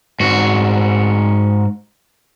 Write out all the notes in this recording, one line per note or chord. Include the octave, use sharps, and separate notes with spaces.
G#2 F#4